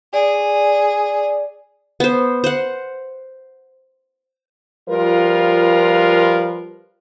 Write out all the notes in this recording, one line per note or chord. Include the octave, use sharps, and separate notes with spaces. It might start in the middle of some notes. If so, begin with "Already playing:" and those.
G#4 D5
B3 C5
C5 F#5
F3 G3 F4 A#4 B4